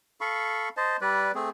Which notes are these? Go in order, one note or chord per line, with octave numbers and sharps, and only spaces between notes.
A4 F5 B5 C#6
C5 D#5 A5
G3 B4 D5
A3 C4 G#4